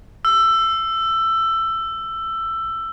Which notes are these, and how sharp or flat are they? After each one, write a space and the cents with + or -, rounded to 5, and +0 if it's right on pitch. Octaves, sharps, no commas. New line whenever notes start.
E6 +15